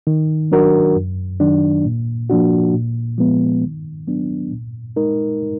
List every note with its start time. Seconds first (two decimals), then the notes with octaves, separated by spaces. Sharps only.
0.07 D#3
0.52 F#3 D4 F#4 A#4
0.96 F#2
1.40 D#3 F#3 D4
1.85 A#2
2.30 F3 A#3 D4 F#4
2.74 A#2
3.18 F3 G#3 B3
3.63 D#3
4.07 F#3 B3 D4
4.51 A#2
4.96 G#3 D#4 A#4